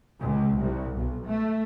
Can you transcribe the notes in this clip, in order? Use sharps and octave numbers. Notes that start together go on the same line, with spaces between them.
C#2
C2
B1
A3